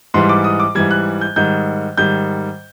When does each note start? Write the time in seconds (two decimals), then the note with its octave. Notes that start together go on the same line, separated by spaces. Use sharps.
0.14 G#2 E3 G3 C6
0.29 D6
0.44 D#6
0.60 D6
0.75 G#2 E3 G3 G#6
0.91 F#6
1.21 G6
1.36 G#2 D#3 G3 G6
1.97 G#2 D#3 G3 G6